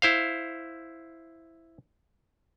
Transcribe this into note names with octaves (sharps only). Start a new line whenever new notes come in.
E4 C5 F5